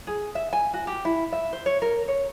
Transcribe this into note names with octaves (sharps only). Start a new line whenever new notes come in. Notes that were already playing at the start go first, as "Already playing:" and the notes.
G#4
E5
G#5
F#4
G4
E4
E5
C5
C#5
A#4
C#5